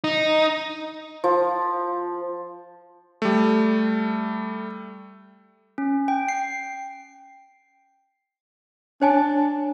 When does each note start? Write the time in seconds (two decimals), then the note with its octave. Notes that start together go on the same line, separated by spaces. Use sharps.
0.04 D#4
1.24 F3
3.22 G3 A3
5.78 C#4
6.08 G5
6.29 C7
9.02 D4 C#5 G#5 A5